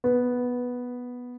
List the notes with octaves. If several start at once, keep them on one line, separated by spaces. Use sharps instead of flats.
B3